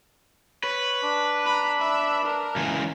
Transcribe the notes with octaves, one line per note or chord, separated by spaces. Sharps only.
B4 C#5
D4
A#5 B5
E5 B5
A#4
C#2 E3